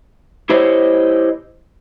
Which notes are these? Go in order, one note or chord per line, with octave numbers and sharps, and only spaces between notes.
E4 G4 C5 C#5 D#5